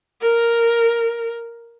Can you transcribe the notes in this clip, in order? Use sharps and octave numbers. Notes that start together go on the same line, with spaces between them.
A#4